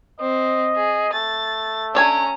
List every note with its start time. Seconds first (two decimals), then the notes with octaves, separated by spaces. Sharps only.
0.20 C4 D#5
0.76 G#4
1.13 A3 A6
1.95 C#4 D4 C#5 G#5 A#5